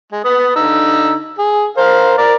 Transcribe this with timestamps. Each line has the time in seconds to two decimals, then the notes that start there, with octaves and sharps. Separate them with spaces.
0.12 G#3
0.25 B3 D#6
0.56 D3 D#4 E6
1.38 G#4
1.77 A#4 C5 F5
2.18 A#4 D5